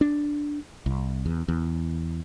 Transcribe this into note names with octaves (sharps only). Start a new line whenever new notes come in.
D4
C2
E2
E2